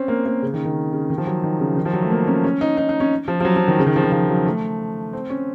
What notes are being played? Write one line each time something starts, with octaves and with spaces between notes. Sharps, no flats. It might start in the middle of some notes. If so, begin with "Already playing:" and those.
Already playing: C4 C#4
A#3
A#3
C#3
D#3
D#3
C#3
D#3
F3
F#3
D#3
C#3
D#3
F3
F#3
A3
A#3
C#4
C#4
D#4
D#4
D#4
C#4
F3
F3
F#3
F3
D#3
C#3
D#3
F3
D#3
F3
F#3
A3
C4
C#4